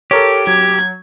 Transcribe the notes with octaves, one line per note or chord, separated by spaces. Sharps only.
G4 A4 A#4 C#5
F#3 G#6